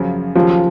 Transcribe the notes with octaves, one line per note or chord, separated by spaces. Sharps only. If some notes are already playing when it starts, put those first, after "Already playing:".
Already playing: F#2 C#3 F3
D#2 C#3 F3 F#3